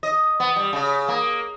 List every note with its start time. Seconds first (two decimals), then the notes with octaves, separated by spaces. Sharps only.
0.03 D#5
0.40 B3
0.56 G3
0.73 C#3
1.08 A#3